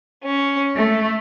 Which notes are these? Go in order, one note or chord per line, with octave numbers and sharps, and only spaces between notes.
C#4
A3